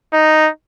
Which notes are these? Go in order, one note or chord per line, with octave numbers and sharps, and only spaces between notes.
D#4